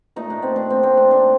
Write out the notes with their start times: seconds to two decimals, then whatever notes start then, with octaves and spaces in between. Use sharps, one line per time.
0.16 A#2 A3 D#4
0.30 D4
0.42 C4
0.56 D4
0.70 C4
0.83 C4
0.97 D4
1.11 D4